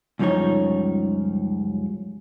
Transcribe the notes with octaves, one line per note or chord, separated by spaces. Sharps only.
C#2 F#2 F3 G3 D#4 C#5